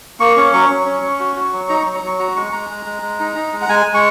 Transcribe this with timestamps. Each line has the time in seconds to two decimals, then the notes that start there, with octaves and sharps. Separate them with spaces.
0.20 A#3 C#6
0.36 C#4 C#6
0.53 F#3 C#6
0.70 F#3
0.86 C#4
1.02 C#4
1.20 F#4
1.36 F#4
1.52 F#3
1.69 D#4 A#5
1.82 F#3 C#6
1.95 A#5
2.03 F#3 C#6
2.19 F#4 A#5
2.36 G#3 C#6
2.52 G#3 A#5
2.70 G#3
2.85 G#3
3.02 G#3
3.20 D#4
3.36 D#4
3.53 G#3
3.62 F#5
3.69 G#3 G#5
3.86 G#3
3.94 C#6